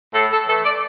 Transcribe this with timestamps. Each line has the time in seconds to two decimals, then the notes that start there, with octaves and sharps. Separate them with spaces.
0.14 A2 A4
0.31 A4
0.47 E3 A4
0.51 A3
0.63 D5